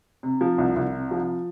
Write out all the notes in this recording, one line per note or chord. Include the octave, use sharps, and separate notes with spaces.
C3
F3
C2
C2
C3
F3